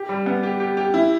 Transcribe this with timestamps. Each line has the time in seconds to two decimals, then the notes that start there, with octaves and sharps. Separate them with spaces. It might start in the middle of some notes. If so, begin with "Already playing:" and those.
Already playing: G4
0.09 G3
0.26 B3
0.43 G4
0.60 G4
0.77 G4
0.94 E4